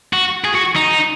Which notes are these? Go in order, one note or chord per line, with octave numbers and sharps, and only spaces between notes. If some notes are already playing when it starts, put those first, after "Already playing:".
F#4
G#4
F#4
D#4